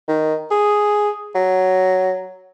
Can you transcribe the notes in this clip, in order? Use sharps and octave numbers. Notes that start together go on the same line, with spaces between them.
D#3
G#4
F#3